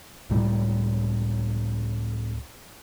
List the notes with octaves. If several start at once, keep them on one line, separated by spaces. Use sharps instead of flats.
C#2 A2 G3